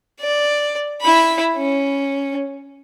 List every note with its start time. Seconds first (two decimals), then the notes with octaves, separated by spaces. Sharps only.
0.20 D5
1.01 E4 B5
1.57 C#4